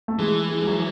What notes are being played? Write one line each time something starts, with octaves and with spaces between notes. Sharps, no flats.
A3
E3 G#3
G#3
G#3
F#3